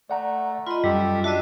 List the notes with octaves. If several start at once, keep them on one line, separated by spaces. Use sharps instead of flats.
A3 D5 F#5 A#5
F4 D#5 B5 C6
F#2 G3 G4 A4
D4 F#4 D#5 E5